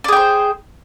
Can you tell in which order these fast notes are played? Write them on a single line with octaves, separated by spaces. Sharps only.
D5 G#4 G5 C5